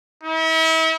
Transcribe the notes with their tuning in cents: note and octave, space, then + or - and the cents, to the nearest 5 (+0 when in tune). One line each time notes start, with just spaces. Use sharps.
E4 -40